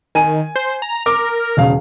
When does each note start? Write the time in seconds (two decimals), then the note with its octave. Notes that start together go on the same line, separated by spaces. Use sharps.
0.15 D#3 G#5 D#7
0.56 C5
0.82 A#5
1.06 A#4 D6
1.57 E1 C#3 F5